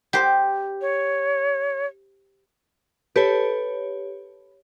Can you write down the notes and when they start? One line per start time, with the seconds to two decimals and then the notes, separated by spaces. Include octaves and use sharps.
0.13 G4 C5
0.81 C#5
3.16 G4 A4 B4 C#5